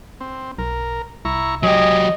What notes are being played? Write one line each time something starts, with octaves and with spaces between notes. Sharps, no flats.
C4
B1 A#4
C2 E4 A#5 C#6
F#3 G4 D#5 G#5